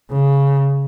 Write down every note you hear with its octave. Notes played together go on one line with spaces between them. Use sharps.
C#3